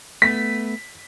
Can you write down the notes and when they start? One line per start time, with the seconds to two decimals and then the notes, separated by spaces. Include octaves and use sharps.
0.22 A3 B3 B6